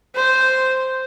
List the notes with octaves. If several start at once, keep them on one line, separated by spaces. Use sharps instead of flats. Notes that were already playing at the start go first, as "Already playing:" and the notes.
C5